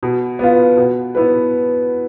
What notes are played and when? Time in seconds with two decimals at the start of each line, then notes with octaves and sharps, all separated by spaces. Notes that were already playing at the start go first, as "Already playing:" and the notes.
0.03 B2
0.39 B3 F4
0.77 B2
1.15 B3 E4 B4